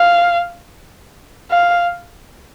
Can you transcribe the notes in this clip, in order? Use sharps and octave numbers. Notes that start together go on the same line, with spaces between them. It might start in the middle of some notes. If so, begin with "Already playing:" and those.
Already playing: F5
F5